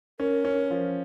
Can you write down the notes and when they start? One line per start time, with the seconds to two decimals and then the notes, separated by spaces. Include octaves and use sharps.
0.20 C#4 A#4
0.45 C#4
0.71 F3